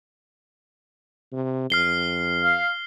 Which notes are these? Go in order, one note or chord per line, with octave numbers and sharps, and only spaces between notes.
C3
F2 F6 C7 G7
F5